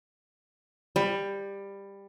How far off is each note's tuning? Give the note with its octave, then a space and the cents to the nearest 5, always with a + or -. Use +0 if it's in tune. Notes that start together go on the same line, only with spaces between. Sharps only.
G3 +15